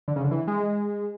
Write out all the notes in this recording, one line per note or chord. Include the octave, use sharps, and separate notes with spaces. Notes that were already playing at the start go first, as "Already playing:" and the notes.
D3
C#3
D3
E3
G#3